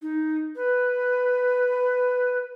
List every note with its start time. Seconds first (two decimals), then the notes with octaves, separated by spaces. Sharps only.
0.02 D#4
0.56 B4